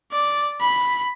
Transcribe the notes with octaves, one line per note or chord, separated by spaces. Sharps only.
D5
B5